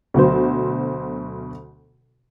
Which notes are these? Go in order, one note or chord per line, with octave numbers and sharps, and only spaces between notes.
D2 B2 F#3 C5